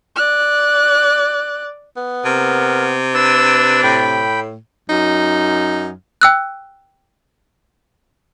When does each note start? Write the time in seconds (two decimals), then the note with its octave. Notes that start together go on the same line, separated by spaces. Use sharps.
0.16 D5 F#6
1.97 B3
2.25 C3 A#4
3.15 D4 B4 E6
3.84 A2 G5 B5
4.90 F#2 D#4
6.21 G5 E6 F#6